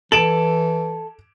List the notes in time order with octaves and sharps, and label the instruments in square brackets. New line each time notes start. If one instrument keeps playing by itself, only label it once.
[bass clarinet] E3 [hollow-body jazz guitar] A4 [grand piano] D7 E7 F#7